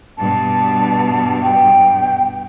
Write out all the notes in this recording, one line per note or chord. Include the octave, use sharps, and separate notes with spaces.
G2 B2 A5
G5